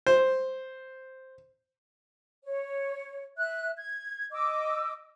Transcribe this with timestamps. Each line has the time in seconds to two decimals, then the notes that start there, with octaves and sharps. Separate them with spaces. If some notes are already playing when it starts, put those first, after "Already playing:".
0.07 C5
2.44 C#5
3.38 E5 F#6
3.78 G#6
4.32 D#5 D6 E6